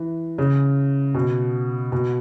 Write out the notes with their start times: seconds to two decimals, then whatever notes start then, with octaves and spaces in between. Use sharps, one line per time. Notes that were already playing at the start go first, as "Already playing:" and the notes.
Already playing: E3
0.38 C#3
1.14 B2
1.92 B2